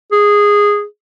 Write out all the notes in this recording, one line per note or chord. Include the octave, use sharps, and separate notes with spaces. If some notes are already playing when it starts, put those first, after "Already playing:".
G#4